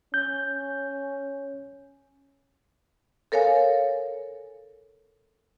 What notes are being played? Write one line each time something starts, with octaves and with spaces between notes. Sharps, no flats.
C#4 G6
A4 A#4 C#5 F5 G#5